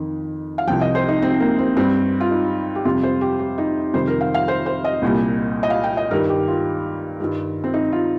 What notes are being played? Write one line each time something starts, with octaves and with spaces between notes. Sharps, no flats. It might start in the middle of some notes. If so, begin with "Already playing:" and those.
Already playing: F2 D#3
F5
C2 C3 F3 G5
D#5
C5
D#4
C4
A#3
C4
G2 G3 C4
F4
D#4
G4
F2 C3 G3 F4
C5
G4
G4
D#4
F2 C3 D#3 G3 C5
A#4
F5
F5
C5
C5
D#5
C2 A#2 G3
D#5
F5
G5
D#5
G2 D#3 G3 A#4
G4
F4
G2 D#3 G3
C4
D#4
F4